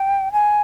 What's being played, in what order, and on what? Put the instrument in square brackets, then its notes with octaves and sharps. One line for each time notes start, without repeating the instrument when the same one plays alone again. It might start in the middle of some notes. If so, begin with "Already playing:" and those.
Already playing: [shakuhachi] G5
G#5